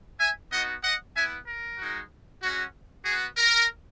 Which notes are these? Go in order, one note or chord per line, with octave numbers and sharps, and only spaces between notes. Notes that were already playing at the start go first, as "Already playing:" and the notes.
E5 G#5
B3 D#4 F#4 D#5 F#5
D#5 F#5
B3 E4 E5 G#5
A#4
G#3 D#4 F#4
G#3 C#4 F#4
B3 F#4 G#4
A#4